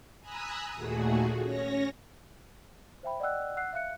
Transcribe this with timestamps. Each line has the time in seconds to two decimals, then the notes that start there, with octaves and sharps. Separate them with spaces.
0.20 G#5 A#5 B5 D#6 E6 F#6
0.75 D#2 A#2 A3 F#4 G#4
1.41 C#4 C#5 A#6
3.03 C5 E5 G5 B5
3.20 D5 D#5 F#5 G5 E6 F#6
3.57 F#5 E6 F#6 C7
3.73 E5 F5 F#6 C#7